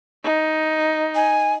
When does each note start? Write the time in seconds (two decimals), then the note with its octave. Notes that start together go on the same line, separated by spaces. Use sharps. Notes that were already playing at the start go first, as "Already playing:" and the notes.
0.24 D#4
1.15 G#5